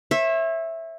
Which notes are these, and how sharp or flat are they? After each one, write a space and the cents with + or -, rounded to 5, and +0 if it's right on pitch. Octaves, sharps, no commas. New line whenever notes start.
C#5 -40 E5 +0